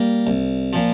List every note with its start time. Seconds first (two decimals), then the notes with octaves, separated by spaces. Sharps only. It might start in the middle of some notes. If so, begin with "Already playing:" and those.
Already playing: G3 A#3
0.27 C2
0.73 A#2 F3